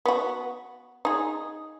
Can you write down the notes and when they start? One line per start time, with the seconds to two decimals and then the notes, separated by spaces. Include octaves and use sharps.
0.05 B3 F#4
1.05 D#4 G#4